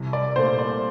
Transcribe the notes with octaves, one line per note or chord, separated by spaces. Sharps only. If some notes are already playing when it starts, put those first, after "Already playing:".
Already playing: C2
D5
A#2 A3 C5
D5